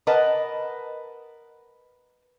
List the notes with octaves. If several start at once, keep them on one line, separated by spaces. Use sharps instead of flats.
A#4 B4 D#5 F#5 A5